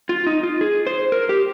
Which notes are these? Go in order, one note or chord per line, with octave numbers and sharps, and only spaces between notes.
F4
D#4
F4
G#4
C5
A#4
G4